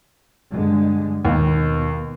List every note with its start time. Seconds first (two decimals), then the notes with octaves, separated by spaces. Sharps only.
0.51 G2 D3 G#3
1.25 D#2 B2